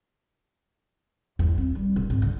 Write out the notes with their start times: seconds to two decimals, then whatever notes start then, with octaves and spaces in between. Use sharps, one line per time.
1.39 E2
1.58 C4
1.75 G3
1.96 E1
2.10 G#1
2.22 D3